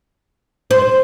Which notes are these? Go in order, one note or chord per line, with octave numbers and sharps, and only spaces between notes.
C5